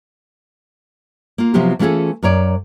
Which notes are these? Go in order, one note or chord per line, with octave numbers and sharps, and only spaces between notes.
A#3 F4
C3 F3 F#3 B3 F4 G4
E3 A3 C#4 F4 G#4 A4
F#2 A#4 C#5 D5